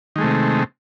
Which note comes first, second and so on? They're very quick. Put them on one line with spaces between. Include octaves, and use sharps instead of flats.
D#3 G#3 A3 C3